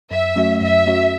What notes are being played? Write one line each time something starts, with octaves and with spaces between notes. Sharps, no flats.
F#2 E5
F#3 A3 C#4 F#4
F#2 E5
F#3 A3 C#4 F#4